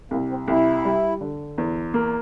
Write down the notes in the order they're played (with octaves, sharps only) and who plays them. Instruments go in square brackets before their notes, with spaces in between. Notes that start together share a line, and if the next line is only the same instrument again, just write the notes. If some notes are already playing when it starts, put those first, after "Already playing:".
[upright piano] C2 [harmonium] A#3
[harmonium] C4
[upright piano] C2 [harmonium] E4
[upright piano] G3
D3
E2
A#3